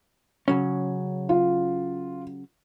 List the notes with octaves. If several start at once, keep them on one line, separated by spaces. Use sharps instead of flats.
C#3 F#3 C#4
F4